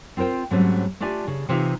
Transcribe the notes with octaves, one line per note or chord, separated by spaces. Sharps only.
C4 F4 A#4 C5 G5
G#2 F#3 G3 A3 C4 C#4
A3 D4 F4 G4 D5 G#5
C#3
C3 E3 D#4 F4 E5 F5